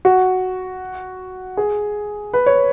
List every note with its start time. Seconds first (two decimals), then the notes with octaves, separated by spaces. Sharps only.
0.05 F#4
1.57 G#4
2.33 B4
2.46 C#5